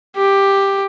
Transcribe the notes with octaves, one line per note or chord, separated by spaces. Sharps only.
G4